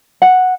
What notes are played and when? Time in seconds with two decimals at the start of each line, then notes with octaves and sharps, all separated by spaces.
0.22 F#5